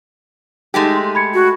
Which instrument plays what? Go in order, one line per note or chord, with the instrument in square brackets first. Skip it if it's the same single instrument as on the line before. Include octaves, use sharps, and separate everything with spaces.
[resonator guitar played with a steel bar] G#3 A3 G4 [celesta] D#4
[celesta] C6
B5 G#6 C#7
[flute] F#4